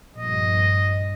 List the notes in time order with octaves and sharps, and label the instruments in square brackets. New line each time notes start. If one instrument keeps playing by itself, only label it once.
[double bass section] A#1 G2 [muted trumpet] D#5